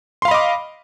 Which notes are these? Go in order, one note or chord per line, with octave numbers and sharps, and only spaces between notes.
D#5 F5 B5 C6 D6